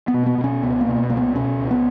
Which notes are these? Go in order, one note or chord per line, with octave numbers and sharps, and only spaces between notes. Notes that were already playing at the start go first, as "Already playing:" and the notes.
B3
B2
B3
B2
C#4
C#2 B3
A#3
B2
C#2 A#3
B3
B2 C#4
C#2
B3